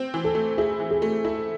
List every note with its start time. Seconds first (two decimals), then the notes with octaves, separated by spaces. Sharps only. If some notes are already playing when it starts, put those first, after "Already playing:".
Already playing: C4
0.14 E3
0.24 A4
0.35 A3
0.58 E4 G#4
0.80 E3
0.91 G#4
1.02 A3
1.25 E4 A4